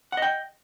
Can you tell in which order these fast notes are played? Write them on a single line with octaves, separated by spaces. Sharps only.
F#5 D#5 G5